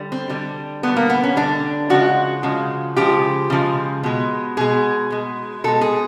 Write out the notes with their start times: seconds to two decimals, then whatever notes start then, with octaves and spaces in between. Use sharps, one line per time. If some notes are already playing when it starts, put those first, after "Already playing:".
Already playing: D3 G3
0.12 C4
0.30 D3 G3
0.83 D3 G3 B3
0.97 A#3
1.10 B3
1.24 C#4
1.36 D3 G3 D4
1.90 C#3 F3 G#3 F#4
2.43 C#3 F3 G#3
2.97 C#3 F3 G#3 G4
3.50 C#3 F3 G#3
4.03 B2 G#3
4.57 B2 G#3 G#4
5.11 B2 G#3
5.64 B2 G#3 A4
5.81 G#4